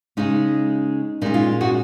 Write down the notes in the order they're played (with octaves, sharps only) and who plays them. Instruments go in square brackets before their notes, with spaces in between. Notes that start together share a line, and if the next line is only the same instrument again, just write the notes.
[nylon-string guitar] C#3 G#3 C#4 D#4
A#2 G#3 C#4 D#4
F4
D#4 F#4